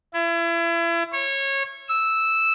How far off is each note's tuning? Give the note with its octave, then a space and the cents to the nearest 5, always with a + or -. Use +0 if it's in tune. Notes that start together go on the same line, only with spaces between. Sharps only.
E4 +35
C#5 -20
E6 -5